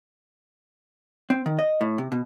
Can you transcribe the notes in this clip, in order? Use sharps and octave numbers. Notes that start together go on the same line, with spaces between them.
C4
D#3
D#5
A2
C3
B2